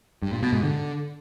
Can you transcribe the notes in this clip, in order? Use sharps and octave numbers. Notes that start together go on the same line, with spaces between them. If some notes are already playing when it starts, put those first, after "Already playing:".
G2
A#2
B2
G#2
D3